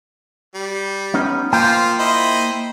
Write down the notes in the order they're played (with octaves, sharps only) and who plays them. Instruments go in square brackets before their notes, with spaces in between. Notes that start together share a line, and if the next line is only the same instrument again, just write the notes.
[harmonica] G3
[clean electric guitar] B3 C#4 D#4
[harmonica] F3 F4 C5 [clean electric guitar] A#3 G5
[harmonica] E4 C5 D#5